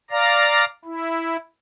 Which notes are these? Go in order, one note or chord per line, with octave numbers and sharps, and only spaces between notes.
D5 F5 A#5
E4